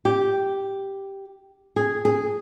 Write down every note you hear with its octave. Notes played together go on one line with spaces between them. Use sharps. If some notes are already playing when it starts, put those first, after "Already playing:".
G4
G#4
G#4